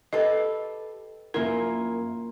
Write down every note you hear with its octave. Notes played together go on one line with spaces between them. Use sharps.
G4 A4 B4 D#5
F#2 A#3 E4 F4 A#4